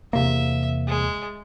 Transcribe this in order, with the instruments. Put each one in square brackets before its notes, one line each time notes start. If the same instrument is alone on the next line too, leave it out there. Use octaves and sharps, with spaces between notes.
[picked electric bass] E2 C3 A#3 [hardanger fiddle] E5
[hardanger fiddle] G#3